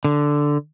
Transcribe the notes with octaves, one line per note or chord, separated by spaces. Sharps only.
D3